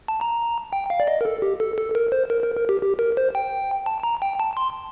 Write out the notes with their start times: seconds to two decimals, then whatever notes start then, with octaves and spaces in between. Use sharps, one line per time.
0.08 A5
0.21 A#5
0.73 G5
0.90 F5
1.00 D5
1.07 D#5
1.21 A#4
1.25 A4
1.42 G4
1.60 A4
1.78 A4
1.95 A#4
2.12 C5
2.30 A#4
2.43 A#4
2.56 A#4
2.69 G4
2.82 G4
2.99 A#4
3.17 C5
3.35 G5
3.86 A5
4.03 A#5
4.22 G5
4.40 A5
4.57 C6